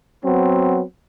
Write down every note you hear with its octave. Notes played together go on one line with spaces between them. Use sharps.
F#3 B3 C4